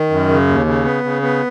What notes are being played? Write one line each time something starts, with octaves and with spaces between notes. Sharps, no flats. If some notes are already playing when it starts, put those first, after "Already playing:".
Already playing: D#3
F#2
C#3
D#2
C#3
B3
C#3
B3